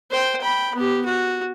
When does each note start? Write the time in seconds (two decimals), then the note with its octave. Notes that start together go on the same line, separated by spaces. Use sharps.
0.11 C5 G5
0.41 G5 B5
0.75 B3 G4
1.05 F#4